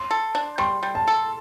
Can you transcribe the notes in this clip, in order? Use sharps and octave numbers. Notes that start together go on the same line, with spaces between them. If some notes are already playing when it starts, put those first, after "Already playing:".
Already playing: C6
A4
D4
G3 C6
G3
A5
A4